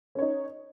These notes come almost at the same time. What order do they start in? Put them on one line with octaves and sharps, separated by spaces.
C#4 C#5 D#4